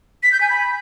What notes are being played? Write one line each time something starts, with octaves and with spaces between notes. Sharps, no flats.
B6
G6
G#5
B5